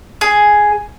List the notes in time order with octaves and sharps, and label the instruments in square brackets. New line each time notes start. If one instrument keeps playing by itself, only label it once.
[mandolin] G#4